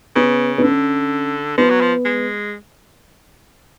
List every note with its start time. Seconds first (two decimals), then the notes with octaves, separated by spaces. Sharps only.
0.15 C#3 B3
0.58 B3
0.63 D3 C#4
1.58 F3 B3
1.70 F#3
1.81 F3
2.05 G#3